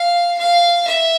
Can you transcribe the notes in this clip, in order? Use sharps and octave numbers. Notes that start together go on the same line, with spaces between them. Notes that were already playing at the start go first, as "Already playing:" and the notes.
Already playing: F5
F5
E5